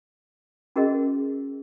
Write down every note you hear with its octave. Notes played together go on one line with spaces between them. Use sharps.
C#4 F#4 G#4 A#4 D#5